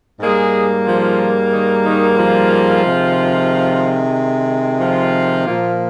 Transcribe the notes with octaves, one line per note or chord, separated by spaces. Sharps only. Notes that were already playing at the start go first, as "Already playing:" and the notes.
G#2 G3 G#3 A#3 G#4
F3 F4
D#3 D#4
D#3 D#4
F3 F4
C3 D#3 G#3
F3 F4
A#2 F3 A#3